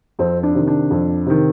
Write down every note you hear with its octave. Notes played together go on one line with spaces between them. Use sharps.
F2 C4
D4
C3 D#3
D4
F2
C3 D#3